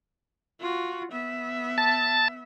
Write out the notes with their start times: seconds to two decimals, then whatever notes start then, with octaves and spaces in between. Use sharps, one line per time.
0.60 F4 F#4
1.12 B3 E5
1.78 A5